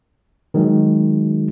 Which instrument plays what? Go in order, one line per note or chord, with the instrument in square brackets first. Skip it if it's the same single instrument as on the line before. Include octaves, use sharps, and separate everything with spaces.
[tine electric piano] D#3 F#3 G#3